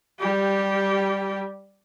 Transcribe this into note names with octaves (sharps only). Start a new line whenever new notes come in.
G3 G4